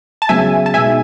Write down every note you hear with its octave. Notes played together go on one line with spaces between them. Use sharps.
A5
C#3 F#3 B3 E5 G#5
A5
B2 G#3 D#4 E5 G#5